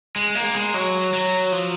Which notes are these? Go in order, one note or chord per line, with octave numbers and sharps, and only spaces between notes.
G#3
A#3
G#3
F#3
F#3
F3